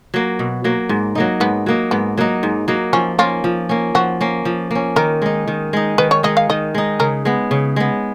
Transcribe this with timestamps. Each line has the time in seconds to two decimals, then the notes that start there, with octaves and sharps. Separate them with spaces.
0.14 F#3 A#3
0.39 B2
0.64 F#3 A#3
0.89 G#2
1.15 F#3 A#3 D#4
1.40 G#2 B3
1.66 F#3 A#3 D#4
1.91 G#2 B3
2.17 F#3 A#3 D#4
2.43 G#2
2.68 F#3 A#3 D#4
2.93 F3 C#4
3.19 A#3 C#4 F4
3.44 F3
3.69 A#3 C#4
3.95 F3 F#4
4.21 A#3 C#4
4.45 F3
4.71 A#3 C#4
4.96 D#3 A#4
5.22 G#3 D#4
5.48 D#3
5.73 G#3 D#4
5.98 D#3 B4
6.11 C#5
6.23 G#3 D#4 D#5
6.37 F5
6.49 D#3 D#5
6.75 G#3 D#4
6.99 C#3 A#4
7.25 G#3 B3
7.51 C#3
7.76 G#3 B3